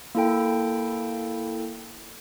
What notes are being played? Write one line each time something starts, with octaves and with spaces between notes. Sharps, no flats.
A#3 E4 A4 G5